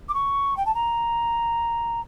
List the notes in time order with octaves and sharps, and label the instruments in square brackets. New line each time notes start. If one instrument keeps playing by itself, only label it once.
[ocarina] D6
C#6
G5
A5
A#5